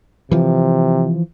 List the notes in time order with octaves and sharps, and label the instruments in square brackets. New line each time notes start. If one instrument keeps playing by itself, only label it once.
[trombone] C3 [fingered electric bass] E3 F3